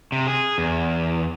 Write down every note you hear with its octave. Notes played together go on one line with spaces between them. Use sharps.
C3
G#4
E2